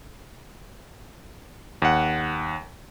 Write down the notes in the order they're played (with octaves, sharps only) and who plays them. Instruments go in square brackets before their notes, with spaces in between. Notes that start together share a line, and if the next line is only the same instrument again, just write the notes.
[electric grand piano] D#2 F#5